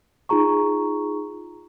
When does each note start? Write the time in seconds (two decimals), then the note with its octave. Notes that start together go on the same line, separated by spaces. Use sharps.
0.29 D#4 F4 G#4 A#5 C#6